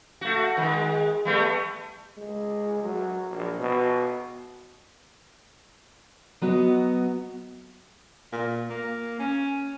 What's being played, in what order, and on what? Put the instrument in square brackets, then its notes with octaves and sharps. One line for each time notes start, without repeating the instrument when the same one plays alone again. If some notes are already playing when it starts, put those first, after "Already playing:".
[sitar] A3 F#4
D#3 G#3
G3 A3 B3
[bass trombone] G#3
F#3
A#1
B2
[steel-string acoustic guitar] F#3 B3 F#4 D#5
[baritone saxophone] A#2
A#3
C#4